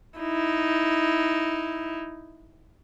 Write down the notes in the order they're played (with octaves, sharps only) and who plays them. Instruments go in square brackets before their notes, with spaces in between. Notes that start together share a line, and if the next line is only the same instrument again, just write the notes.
[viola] D#4 E4